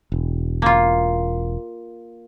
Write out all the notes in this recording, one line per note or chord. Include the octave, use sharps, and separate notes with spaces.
E1
A#3 F4